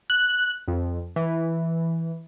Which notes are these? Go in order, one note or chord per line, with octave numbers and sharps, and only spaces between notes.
F#6
F2
E3